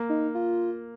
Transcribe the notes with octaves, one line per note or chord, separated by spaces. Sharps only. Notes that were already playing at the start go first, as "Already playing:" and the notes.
Already playing: A#3
D#4
F4